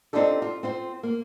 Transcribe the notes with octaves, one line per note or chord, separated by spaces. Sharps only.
C4 D4 D#4 F4 G4 A4
F4
C4 F4 C5
A#3